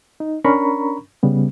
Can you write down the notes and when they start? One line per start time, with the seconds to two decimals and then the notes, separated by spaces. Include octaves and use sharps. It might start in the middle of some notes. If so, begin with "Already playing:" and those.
0.20 D#4
0.44 C#4 D4 A#4 A#5 B5 C#6
1.23 C#3 G3 B3